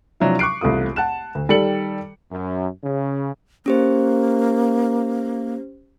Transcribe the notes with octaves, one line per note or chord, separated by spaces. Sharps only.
C3 F3 F#3 D4 E4
C#6 D6 F#6 C7 D7
E1 C2 A3 F4 D#6
F#5 A5 F#6 E7
D2
D#3 G3 G4 A4 C#7 F#7
F#2
C#3
A#3 C#4 G4 C5